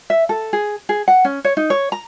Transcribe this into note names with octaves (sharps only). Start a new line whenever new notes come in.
E5
A4
G#4
G#4
F#5
C#4
C#5
D#4
C#5
A#5